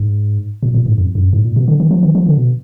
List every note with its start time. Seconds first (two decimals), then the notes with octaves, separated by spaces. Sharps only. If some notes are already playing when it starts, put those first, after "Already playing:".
Already playing: G#2
0.63 A#2
0.74 A#2
0.86 G#2
0.98 F2
1.15 F#2
1.33 G#2
1.44 A#2
1.56 B2
1.68 D3
1.80 D#3
1.91 F3
2.03 D#3
2.15 F3
2.26 D3
2.37 B2